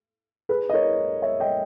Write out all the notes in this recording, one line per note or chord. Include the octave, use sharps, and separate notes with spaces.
G#4 B4
D#5
A#4 C#5
C#5 E5
D#5 G5